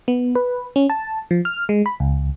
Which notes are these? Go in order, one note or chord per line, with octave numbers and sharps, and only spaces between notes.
B3
B4
C#4
A5
F3
F6
G#3
B5
C#2